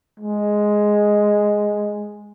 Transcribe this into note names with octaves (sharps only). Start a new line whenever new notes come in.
G#3